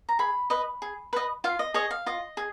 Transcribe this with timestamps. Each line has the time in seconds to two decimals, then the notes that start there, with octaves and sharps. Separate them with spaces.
0.09 A#5
0.19 G#4 B5
0.50 B4 D#5
0.82 G#4
1.13 B4 D#5
1.44 F4 F5
1.59 D#5
1.74 G#4 C#5 D#5
1.91 F5
2.06 F4 D#5
2.37 G#4